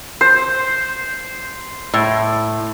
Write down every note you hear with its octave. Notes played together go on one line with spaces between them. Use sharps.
C5
A2